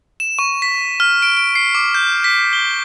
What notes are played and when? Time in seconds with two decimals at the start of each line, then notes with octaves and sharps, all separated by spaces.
0.20 E7
0.39 C#6
0.62 B6
1.00 F6
1.22 D7
1.37 D7
1.55 C7
1.75 D6
1.95 G6
2.24 B6
2.53 G7